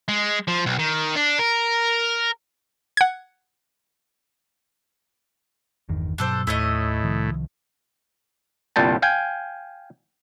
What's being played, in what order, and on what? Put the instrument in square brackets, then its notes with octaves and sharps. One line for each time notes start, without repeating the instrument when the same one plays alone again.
[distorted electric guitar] G#3
F3
B1
D#3
D4
A#4
[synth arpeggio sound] F#5 G#6
[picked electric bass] G1 E2 D#3
[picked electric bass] G2 B2 F#3 [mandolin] D4 A4 C5
[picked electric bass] D#2 [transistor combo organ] A2 [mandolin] E4 C#5 D#5
[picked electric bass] C2 D#3 F3
[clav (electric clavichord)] G1 C2 A#2 G5 A5
F5 G5 G#5